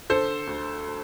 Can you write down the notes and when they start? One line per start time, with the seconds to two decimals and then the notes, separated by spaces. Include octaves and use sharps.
0.10 D3 A4 C5
0.47 D2